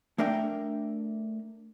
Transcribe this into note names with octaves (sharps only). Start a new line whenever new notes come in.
A3 D4 A#4 E5 G5